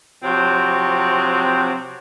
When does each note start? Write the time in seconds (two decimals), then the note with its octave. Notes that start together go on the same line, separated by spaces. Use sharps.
0.23 C3 F3 F#3 C4 D4 F#4